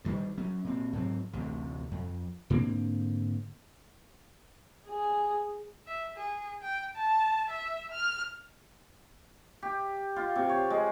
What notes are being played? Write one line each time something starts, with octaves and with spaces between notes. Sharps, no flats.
G2 D#3 F#3 G3
F#3 C#4
A#2 C4
G#2 F#3 C4
A1 D2 C3
F2
G#2 D3 A#3 C4
G#4
E5
G#4
G5
A5
E5
F6
G4
F4
C3
C#5
G#3